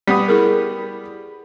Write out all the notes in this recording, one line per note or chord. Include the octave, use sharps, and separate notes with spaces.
G3 B3 D#6
E4 G#4 A#4